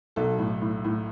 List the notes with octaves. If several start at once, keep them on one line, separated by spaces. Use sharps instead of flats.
B1 A4
A2
A2
A2